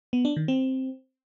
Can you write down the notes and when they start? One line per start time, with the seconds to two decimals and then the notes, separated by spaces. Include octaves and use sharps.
0.13 B3
0.25 D4
0.37 D#3
0.48 C4